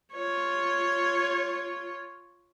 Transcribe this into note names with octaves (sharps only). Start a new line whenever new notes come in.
F4 C#5